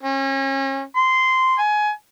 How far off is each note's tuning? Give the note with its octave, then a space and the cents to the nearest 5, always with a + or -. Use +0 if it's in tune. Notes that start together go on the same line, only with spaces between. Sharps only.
C#4 -35
C6 -10
G#5 +20